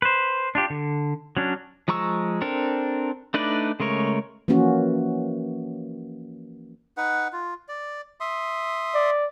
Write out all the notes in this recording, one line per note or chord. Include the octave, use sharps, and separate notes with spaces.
B4 C5
D4 F4 G4
D3
F#3 C#4 D4
F3 G#3 A#5 C#6 E6
C4 D4 A4 A#4
A3 D4 D#4 B4 D5
C#3 G#3 A3 A#4 C#5
E3 F3 A#3 C#4 F#4
D#4 B4 F#5
F4
D5
E5 C6 D#6
D5